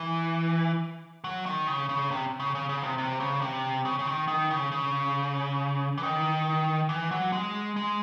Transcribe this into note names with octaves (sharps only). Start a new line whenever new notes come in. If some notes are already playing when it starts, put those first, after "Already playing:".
Already playing: E3
F#3
D#3
C#3
C#3
C3
C#3
C#3
C#3
C3
C3
C#3
C3
C#3
C#3
D#3
D#3
C#3
C#3
E3
D#3
E3
F#3
G#3
G#3